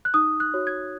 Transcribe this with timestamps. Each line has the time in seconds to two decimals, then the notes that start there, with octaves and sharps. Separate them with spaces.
0.05 F#6
0.14 D#4 D#6
0.40 F#6
0.54 F#4 C#5
0.67 G#6